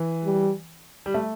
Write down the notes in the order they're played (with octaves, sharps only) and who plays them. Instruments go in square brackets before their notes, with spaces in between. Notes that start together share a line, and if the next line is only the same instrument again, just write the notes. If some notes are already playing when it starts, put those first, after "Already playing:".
Already playing: [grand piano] E3
[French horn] G3
[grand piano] G3
A3